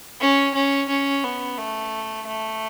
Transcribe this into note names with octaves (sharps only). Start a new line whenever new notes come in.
C#4
C#4
C#4
B3
A3
A3